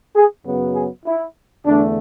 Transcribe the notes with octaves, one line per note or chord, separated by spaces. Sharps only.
G#4
F#2 C#3 F#3 B3
G#4
E4
E2 D3 A3 D4